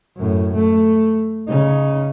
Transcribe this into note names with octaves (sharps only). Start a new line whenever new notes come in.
F#2 A2
A3
C#3 D#4